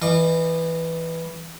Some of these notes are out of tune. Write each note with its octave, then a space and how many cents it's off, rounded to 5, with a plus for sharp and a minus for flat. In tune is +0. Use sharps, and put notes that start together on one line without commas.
E3 +0 D#5 -35